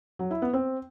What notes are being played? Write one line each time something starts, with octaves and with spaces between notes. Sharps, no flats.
F#3
E4
B3
C4